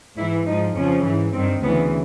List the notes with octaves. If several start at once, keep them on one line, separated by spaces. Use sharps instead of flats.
G#2 E3 E4
G#2 F3 D#4
F2 C#3 F3 C#4
G#2 E3
G2 D#3 C4
D2 C#3 E3 B3